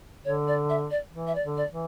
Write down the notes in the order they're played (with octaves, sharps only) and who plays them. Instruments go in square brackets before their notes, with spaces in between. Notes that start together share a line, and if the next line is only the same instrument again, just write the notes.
[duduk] D3 [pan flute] C#5
[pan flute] D5
E5
D5
[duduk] E3
[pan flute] E5
D5
[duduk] D3
[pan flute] D5
[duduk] E3